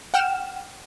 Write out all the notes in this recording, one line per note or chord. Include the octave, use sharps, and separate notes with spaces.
F#5 G5 F6 E7